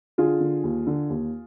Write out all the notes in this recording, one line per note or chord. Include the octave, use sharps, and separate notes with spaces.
D3 F4 G#4
D3
D#2
D3
D#2